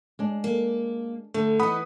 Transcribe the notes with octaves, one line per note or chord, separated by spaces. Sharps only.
G#3 D4
A#3
D3 A3
E3 B3 D#4 F#5 B5 D#6